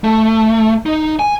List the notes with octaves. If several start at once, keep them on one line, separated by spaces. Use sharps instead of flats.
A3
D#4
G#5